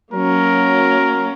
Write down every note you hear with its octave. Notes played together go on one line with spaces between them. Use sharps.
F#3 A#3 C#4 A#4